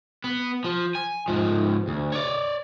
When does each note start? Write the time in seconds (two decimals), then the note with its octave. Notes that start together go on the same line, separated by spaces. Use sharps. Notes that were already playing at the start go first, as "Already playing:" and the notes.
0.24 B3
0.64 F3
0.95 G#5
1.28 G#2 F3
1.88 D2
2.12 C#5 D5